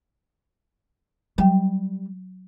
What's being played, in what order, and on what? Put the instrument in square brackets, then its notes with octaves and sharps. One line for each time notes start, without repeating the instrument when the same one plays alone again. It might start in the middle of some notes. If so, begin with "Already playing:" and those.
[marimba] F#3 G5 [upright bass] G3